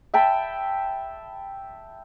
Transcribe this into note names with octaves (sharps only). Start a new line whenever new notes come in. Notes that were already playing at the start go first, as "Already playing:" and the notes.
E5 G5 A5 B5